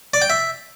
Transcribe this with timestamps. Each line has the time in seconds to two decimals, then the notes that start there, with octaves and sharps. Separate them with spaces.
0.14 D5
0.22 G5
0.30 E5